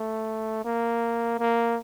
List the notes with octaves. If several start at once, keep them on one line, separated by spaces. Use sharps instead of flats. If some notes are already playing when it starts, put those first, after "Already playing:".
Already playing: A3
A#3
A#3